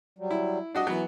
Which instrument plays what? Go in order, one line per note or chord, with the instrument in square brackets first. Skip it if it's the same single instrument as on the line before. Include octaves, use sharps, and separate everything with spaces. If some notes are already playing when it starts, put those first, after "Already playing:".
[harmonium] F#3 G3
[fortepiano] E4
[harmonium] G3 [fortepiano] D4 F#4 D#5
[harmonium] E3 [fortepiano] F#3 B3